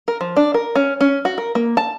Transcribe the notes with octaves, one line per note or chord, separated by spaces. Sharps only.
A#4
F3
D4
A#4
C#4
C#4
F#4
A#4
A#3
A5